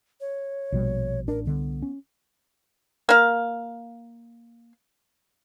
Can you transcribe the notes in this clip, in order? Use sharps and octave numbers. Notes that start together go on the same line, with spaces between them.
C#5
A#1 B2 G3
A1 D4 A#4
C2 D3 B3
C#4
A#3 F5